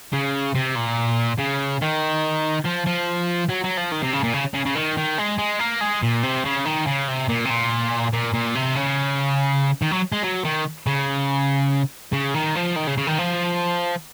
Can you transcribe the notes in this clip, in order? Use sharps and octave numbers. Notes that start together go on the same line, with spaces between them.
C#3
C3
A#2
C#3
D#3
F3
F3
F#3
F#3
F3
D#3
C3
C#3
A#2
C#3
C#3
C#3
D#3
D#3
G#3
G#3
A#3
G#3
A#2
C3
C#3
D#3
C#3
C3
A#2
C3
A#2
A#2
A#2
C3
C#3
D#3
F#3
G#3
F#3
D#3
C#3
C#3
D#3
F3
D#3
C#3
C#3
D#3
F3